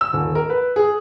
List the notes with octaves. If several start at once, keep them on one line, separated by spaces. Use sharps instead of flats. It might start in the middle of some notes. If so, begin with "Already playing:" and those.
E6
D#1
A#4
B4
G#4